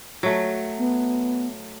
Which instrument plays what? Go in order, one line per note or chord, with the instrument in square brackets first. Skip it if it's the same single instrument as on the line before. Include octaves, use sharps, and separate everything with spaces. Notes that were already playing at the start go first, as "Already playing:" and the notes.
[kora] F#3 A3
[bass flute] B3